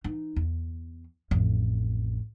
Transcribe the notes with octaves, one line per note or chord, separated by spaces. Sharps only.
E3 D#4
E2
A1 F2